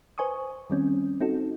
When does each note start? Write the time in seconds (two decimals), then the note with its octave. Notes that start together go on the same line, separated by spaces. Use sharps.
0.18 B4 C5 G#5 C#6 D#6
0.70 D#3 G3 C4 C#4
1.21 C4 D#4 F#4 A4